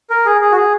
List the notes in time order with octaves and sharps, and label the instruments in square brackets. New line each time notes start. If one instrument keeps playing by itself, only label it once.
[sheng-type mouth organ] A#4
G#4
G#4
F#4
G#4